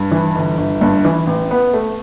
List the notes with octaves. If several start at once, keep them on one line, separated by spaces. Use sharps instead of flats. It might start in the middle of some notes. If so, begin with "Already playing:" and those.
Already playing: G2
E3
G1
G1
G2
E3
A1
B3
A3